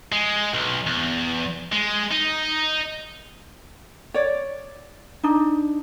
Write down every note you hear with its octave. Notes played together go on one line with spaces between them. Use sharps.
G#3
B1
E2
G#3
D#4
C#5 D5
D4 D#4